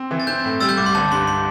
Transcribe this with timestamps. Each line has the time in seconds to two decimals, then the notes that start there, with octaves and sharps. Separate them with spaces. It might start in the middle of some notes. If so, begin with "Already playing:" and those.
Already playing: C4
0.11 E3
0.20 A6
0.27 C4 G6
0.45 A2
0.60 G3 E6 A6
0.69 G6
0.77 C2 D6
0.86 C6
0.95 G1 A5
1.12 G2 C6
1.27 C6